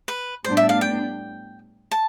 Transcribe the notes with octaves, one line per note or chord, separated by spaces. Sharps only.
B4
A2 G3 B3 D4 C5
E5
F5
G5
A5